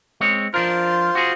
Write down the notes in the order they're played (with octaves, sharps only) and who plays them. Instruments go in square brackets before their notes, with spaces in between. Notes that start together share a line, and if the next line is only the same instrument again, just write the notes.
[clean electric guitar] G#3 C4 C#5
[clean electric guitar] F3 D4 A#4 [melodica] F4 C5
[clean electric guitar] F#4 G#4